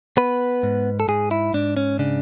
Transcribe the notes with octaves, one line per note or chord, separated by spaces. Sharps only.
B3 B4
G#2
A4
G#2 G#4
E4
G#2 D4
C#4
C#3 D4